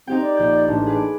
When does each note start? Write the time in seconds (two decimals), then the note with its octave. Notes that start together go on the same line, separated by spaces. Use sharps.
0.07 C4 D#4 G4 G5
0.21 D5
0.37 A#1 G6
0.68 A1 D4
0.86 G#4 B4 D6